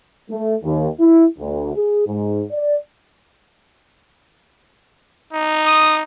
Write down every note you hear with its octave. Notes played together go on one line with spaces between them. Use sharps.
A3
D#2
E4
D2
G#4
G#2
D5
D#4
D#6